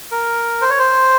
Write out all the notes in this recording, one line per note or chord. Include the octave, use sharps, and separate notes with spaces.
A#4
C5
C#5
C5